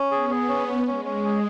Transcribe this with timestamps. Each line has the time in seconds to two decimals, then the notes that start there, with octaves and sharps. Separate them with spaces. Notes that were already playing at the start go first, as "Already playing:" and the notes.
Already playing: C#4
0.11 B3 G#4
0.30 G#4
0.49 C#4
0.68 C#4
0.87 G#3 C#4
1.05 C#4
1.24 G#4